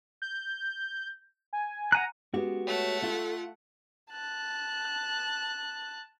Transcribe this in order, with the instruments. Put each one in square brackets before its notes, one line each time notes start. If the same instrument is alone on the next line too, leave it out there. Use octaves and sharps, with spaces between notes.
[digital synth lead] G6
G#5
[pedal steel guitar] F#5 G#5 F#6 [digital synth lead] A#5
[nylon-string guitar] G#3 B3 G4 [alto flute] C#4 [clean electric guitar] F#4
[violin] A3 F#5 [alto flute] C#5
[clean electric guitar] F4 [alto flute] A4
[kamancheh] A5 F#6